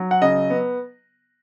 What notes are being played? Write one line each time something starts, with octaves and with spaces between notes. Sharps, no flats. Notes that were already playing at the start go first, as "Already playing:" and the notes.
Already playing: F#3
F#5
C#3 D#5
B3